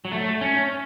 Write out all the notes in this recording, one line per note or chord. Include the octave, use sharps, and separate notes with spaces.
F#3
A3
C#4